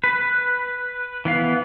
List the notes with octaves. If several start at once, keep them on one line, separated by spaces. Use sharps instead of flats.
B4
E3 B3 F5